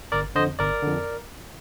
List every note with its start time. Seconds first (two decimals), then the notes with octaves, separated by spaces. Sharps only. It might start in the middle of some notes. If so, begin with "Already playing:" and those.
0.12 G1 A#4 D5
0.35 D3 C5 D#5
0.39 F2
0.59 G1 A#4 D5
0.83 F2 D3